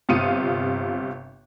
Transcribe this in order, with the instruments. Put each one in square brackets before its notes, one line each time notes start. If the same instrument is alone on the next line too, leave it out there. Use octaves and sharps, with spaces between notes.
[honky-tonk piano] G1 C3 F4 D#6 C#7 D#7